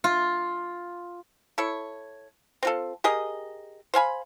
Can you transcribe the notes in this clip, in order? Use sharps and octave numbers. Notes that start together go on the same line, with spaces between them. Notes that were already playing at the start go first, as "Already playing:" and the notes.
F4
E4 A4 C#5
C4 F4 A4
G4 G#4 A#4 D#5
C5 F5 G#5 B5